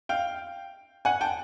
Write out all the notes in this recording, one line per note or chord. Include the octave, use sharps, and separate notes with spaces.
F5 G5
F#5 G#5
G5 A5